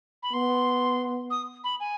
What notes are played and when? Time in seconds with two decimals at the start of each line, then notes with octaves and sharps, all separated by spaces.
0.23 B5
0.33 B3 C6
1.30 D#6
1.64 B5
1.80 G#5